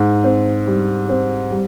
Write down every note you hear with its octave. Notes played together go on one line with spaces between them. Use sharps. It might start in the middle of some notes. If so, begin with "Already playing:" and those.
Already playing: G#2
C4
G3
C4
G3